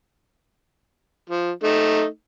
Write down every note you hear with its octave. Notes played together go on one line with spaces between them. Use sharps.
F3
A3 D#4